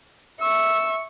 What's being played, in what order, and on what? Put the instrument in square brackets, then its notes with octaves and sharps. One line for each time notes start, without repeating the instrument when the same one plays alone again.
[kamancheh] E5 C#6 [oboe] E6